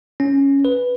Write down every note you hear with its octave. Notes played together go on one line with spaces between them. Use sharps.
C#4
B4